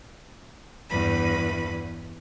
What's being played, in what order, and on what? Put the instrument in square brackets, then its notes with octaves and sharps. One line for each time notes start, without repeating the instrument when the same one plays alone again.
[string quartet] E2 G2 B4 B5